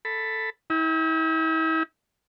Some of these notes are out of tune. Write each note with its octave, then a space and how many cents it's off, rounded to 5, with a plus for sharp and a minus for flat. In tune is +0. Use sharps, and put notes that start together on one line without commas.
A4 +5 B5 +5
E4 -40 G5 +0